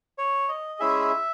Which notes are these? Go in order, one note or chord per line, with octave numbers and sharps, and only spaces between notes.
C#5
D#5
G#3 C#4 E4 G#4 E5